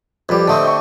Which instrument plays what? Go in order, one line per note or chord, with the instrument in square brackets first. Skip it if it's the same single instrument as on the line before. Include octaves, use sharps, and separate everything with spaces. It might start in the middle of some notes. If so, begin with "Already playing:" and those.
[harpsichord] F2 G3 [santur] G4 B4
[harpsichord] D3 A3 C4 [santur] C5 D#5 A5
[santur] D#5 C#6